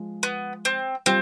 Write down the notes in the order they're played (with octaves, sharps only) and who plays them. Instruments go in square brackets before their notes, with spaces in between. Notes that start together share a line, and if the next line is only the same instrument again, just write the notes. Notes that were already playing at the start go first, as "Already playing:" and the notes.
Already playing: [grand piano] F3 G#3
[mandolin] B3
C4
[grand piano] G3 F4 [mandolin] C4